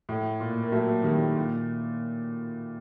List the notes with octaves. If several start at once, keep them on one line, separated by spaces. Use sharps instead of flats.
A2
A#2
A#3
F#3 A3
D#3 G3
A#2